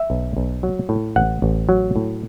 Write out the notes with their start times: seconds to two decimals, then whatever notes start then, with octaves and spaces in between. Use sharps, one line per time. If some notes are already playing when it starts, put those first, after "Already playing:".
Already playing: E5
0.10 B1
0.37 B1
0.63 F#3
0.89 A2
1.16 A1 F#5
1.42 A1
1.69 F#3
1.96 A2